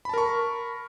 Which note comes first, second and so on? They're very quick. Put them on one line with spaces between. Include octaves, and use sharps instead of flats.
B5 A5 A#4 C#6